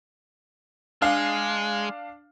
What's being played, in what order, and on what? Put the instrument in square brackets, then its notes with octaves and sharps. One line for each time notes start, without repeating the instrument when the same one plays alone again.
[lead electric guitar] G#3 [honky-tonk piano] D4 F5